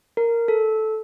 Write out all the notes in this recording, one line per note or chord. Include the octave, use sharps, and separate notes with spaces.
A#4
A4